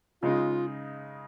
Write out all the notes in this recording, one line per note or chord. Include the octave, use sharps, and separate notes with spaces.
C#3 G#3 D#4 F4